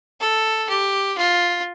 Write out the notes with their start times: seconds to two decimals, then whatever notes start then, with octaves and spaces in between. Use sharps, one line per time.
0.20 A4
0.69 G4
1.18 F4